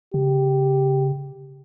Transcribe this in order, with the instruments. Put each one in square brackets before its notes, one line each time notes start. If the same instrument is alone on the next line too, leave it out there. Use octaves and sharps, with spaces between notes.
[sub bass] C#3 [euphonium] G4